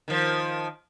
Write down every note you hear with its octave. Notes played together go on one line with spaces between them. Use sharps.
D#3 F3